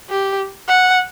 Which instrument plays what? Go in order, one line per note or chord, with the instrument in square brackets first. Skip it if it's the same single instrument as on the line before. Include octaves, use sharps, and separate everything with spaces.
[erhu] G4
F#5